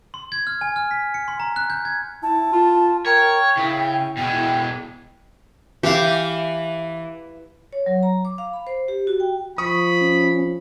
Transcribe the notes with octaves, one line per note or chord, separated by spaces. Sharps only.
C6
G#6
F6
G#5
F6
B6
C#7
C6
A#5
F#6
G6
G#6
E4 A5
F4
A#4 C#5 G5
C#3 E4
B2 G#3 G5
E4
E3 G4 F5
C#5
F#3
A#5
D6
F5
B5
C5
G4
F#4
G5
F3 B5 C#6 D#6
C#4